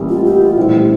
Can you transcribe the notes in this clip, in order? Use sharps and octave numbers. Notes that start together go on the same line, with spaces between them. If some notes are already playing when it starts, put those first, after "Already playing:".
Already playing: A1 A2 E3 G3 A#3
F4
G4
F4
A#1 A2 G3 C4 E4